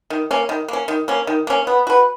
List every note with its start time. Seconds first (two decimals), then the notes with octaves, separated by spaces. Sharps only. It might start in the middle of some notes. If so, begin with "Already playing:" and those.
0.10 D#3
0.31 A#3 C#4
0.49 D#3
0.68 A#3 C#4
0.88 D#3
1.08 A#3 C#4
1.27 D#3
1.47 A#3 C#4
1.67 B3
1.87 F#4 B4